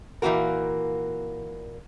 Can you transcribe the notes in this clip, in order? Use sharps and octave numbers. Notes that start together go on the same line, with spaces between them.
A#2 E3 G3 A#3 F#4 A#4